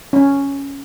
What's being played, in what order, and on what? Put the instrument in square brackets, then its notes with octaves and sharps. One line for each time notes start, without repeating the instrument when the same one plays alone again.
[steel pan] C#4